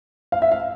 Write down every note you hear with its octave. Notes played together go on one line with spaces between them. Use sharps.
F5
E5
F5